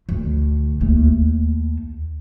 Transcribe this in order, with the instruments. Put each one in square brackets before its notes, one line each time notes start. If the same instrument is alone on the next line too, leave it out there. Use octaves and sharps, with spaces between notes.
[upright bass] D2
D#2 A3